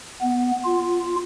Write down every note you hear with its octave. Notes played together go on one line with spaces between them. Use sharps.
B3
F4